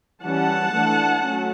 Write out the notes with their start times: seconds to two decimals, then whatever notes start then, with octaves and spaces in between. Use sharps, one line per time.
0.23 E3 G3 C#4 F#5 A5
0.72 E3 A3 D4
1.20 F#3 A3 C#4